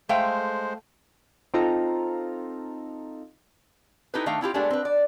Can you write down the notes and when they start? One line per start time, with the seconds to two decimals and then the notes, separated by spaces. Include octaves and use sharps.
0.09 G#3 A3 C5 F5 G5
1.54 C4 D#4 F4 A4 A#5
4.14 D#4 E4 G4 A4 B4
4.26 D#3 A3 D4 F5
4.41 C4 E4 F4 G4
4.54 G#3 A3 B3 D4 G4
4.70 C4 B4
4.85 D5